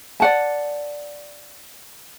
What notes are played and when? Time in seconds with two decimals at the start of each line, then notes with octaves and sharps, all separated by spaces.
0.20 D5 F#5 A5